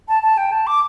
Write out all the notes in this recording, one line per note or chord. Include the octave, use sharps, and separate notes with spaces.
A5
A5
G5
A5
D6